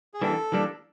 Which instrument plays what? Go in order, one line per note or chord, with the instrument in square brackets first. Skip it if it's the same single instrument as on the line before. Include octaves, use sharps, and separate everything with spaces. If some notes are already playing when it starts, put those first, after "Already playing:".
[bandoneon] G#4
[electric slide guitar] E3 G3 A#3 D4 [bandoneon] A4
[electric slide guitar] E3 G3 A#3 D4